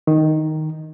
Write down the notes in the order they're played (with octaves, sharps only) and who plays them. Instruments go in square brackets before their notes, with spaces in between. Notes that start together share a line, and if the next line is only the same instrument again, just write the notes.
[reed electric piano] D#3